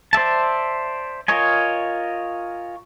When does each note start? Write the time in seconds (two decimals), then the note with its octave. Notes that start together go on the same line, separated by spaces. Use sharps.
0.13 C5 D5 E5 A5
1.28 F4 A#4 C#5 D#5 G#5